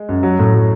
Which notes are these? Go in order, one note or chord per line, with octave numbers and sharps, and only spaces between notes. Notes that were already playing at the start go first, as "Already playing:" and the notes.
Already playing: G#3
F#2
F#3
A2
F#3